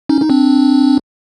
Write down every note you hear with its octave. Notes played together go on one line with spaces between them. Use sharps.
C#4 D#4
D#4
C4 D4